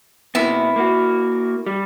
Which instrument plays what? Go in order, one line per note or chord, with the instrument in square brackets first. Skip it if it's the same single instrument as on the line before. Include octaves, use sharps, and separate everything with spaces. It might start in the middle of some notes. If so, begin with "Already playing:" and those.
[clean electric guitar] C3 A#3 B3 [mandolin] E4
[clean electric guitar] A#3 F#4
G3